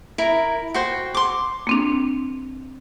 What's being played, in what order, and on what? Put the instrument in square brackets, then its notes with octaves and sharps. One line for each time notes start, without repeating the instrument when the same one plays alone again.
[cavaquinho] E4 A#4 A#5
F#4 C5 G5
C6 D6
[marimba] A#3 C4 D4